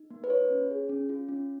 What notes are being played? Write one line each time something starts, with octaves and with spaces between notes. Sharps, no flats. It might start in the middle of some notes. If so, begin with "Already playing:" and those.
Already playing: D#4
A#3
B4
F4 C#5
C#4
G#4
C#4
F4
C#4